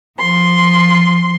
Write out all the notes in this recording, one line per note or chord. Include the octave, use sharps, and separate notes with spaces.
F3 C6